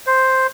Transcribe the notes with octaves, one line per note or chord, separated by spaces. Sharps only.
C5